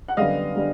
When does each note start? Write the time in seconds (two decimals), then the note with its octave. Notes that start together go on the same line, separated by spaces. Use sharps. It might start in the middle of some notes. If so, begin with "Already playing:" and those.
0.08 F#5
0.17 F#2 D3 G3 B3 D#5 F5
0.56 D3 G3 B3